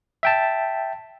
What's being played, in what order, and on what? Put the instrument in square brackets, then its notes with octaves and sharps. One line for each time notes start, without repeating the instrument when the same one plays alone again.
[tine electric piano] E5 G5 A5